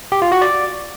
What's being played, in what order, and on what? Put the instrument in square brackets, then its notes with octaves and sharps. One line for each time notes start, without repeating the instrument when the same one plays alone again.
[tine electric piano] G4
F4
F#4
D5